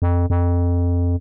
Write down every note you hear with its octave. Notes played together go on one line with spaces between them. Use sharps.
F2
F2